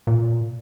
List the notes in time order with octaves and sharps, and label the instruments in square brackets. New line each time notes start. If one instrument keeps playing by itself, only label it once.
[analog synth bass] A#2